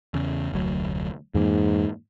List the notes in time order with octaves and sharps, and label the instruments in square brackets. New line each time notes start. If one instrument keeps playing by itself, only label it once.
[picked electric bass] E2 C#3
F1 D2 F#3
[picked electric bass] F2 E3 A#3 [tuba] G#2